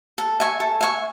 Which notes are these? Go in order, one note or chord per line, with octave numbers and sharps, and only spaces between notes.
A4
E5 G#5 C#6
A4
E5 G#5 C#6